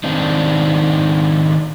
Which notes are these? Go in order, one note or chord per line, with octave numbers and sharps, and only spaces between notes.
D#3 C4 D4 D#4